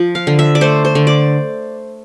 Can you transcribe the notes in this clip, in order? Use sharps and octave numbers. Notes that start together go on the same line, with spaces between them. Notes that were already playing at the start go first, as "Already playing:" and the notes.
Already playing: F3
F5
D3
E5
D5
A3 C5
C5
D3
D5